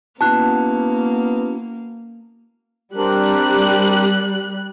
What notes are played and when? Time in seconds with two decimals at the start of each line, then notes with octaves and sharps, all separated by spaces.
0.21 A#3 B3 C#4 E4 F#4 A5 F#6
2.96 G3 C4 D4 A#4 F#6